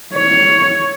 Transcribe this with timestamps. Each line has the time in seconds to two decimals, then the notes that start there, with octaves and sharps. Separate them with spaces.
0.14 C#5